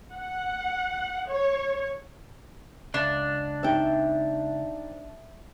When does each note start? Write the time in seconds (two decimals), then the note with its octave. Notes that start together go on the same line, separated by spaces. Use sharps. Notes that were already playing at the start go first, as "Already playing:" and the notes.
0.12 F#5
1.28 C#5
2.94 C#2 D4
3.63 C4 D#4 E5 G5